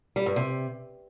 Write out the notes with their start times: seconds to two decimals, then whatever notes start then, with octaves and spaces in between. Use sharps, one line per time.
0.16 G3
0.26 G2
0.36 C3